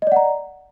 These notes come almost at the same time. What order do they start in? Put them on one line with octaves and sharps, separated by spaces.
D#5 D5 F#5 A#5